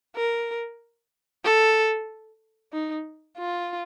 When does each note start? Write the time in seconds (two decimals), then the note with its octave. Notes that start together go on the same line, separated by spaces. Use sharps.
0.16 A#4
1.44 A4
2.73 D#4
3.38 F4